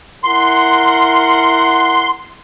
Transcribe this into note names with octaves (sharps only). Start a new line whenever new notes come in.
E4 A#4 F#5 C6